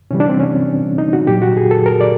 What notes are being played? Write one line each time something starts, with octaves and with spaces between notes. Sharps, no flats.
C3 E3 G3 C#4
D4
C4
C#4
D#4
F#4
A#2 F#3 G4
F#4
G#4
A4
A#4
D5